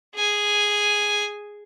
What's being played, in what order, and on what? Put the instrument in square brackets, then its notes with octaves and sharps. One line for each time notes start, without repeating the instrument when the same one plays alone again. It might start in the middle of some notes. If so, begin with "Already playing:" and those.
[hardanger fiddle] G#4 G#5